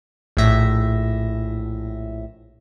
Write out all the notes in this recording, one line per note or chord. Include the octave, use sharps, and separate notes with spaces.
A#1 A2 E5 A#6